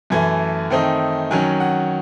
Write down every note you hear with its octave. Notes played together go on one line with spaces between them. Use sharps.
F#2 E3 A3 G#5
D#3 A3 C4 D#4
D#3 F#3 C#4 G#5
F#5